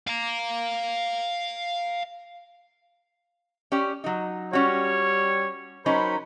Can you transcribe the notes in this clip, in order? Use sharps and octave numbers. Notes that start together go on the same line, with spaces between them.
F5 A#5
C#4 G4 D5
F#3 D#4
G3 C#4 F#4 C#5
F#3 C#4 D#4 A#4 C5 B5